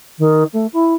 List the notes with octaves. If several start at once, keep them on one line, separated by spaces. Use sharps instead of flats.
D#3
A3
E4